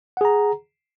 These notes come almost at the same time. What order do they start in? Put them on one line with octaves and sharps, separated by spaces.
F#5 G#4 A#5